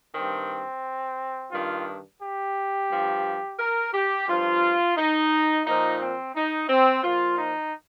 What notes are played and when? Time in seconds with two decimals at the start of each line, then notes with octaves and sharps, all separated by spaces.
0.14 G2 D#3 C4
1.52 G2 D#3 F4
2.21 G4
2.90 G2 F3
3.59 A#4
3.93 G4
4.28 G2 F3 F4
4.97 D#4
5.66 A#2 F3 D#4
6.00 C4
6.35 D#4
6.69 C4
7.03 A#2 F3 F4
7.38 D#4